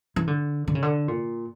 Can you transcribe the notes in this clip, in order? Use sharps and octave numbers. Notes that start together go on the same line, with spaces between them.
E3
D3
D3
C#3
D3
A#2